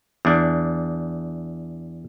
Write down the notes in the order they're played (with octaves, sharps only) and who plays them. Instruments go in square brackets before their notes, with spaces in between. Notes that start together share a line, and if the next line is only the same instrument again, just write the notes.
[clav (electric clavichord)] E2 D4